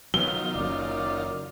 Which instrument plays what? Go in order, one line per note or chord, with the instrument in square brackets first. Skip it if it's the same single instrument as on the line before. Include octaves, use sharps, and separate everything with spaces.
[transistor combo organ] D#3 F4 [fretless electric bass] F#3 B3 [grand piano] G7
[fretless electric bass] F#1 F#2 [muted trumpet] D5